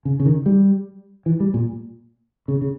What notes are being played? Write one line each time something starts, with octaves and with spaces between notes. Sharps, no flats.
C#3
C#3
D#3
G3
E3
G3
A#2
C#3
C#3